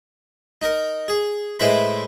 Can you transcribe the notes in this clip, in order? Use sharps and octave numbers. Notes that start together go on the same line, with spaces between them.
D#4 A#4
G#4
A2 G#3 E4 B4 C5 B5